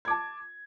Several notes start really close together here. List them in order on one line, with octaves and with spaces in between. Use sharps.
G#6 D6 A5